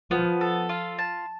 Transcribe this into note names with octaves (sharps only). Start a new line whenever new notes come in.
F3 B3
A4
F4
A5